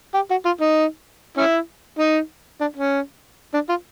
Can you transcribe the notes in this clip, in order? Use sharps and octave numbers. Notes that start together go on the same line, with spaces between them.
G4
F#4
F4
D#4
C#4 E4
D#4
D4
C#4
D4
F4